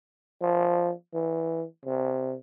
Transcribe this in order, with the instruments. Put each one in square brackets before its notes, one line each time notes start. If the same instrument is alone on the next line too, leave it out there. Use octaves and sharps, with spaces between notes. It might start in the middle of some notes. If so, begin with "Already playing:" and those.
[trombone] F3
E3
C3